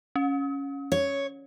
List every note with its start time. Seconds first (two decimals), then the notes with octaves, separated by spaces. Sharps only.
0.16 C#4
0.92 C#5